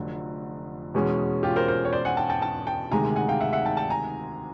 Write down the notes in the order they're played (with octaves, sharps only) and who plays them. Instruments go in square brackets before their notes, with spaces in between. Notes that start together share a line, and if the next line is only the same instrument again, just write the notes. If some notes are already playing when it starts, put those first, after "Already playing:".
Already playing: [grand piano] F1 F2 D3 F#3 A3
E2 B2 G#3 C#4
[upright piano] F4 G4
A#4 C5
A#4 C5
C#5
C5 D5
F#5 G#5
G5 A5
G5 A5
G5 A5
G5 A5
[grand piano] D2 C3 D#3 G#3 [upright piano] G#5 A#5
[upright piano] F#5 G#5
F5 G5
E5 F#5
E5 F#5
G5 A5
G5 A5
G#5 A#5